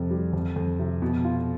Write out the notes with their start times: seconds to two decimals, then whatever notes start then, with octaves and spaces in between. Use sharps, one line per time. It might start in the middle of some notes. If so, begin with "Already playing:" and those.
Already playing: F2 C3
0.11 G3
0.33 F2
0.56 F2
0.79 C3
1.02 B2
1.25 F4